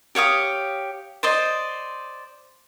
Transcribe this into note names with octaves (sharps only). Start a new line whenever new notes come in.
G4 C#5 F5 D#6
C5 D5 D#5